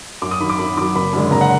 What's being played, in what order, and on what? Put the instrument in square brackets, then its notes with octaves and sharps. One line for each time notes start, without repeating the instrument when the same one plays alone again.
[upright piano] F#2 D6
D#6
D#3 B5
F#3
D6
F#2 B5
D#3 D6
F#3
F#1 B5
F#2 D3 G#3
F#1 A#5
F#5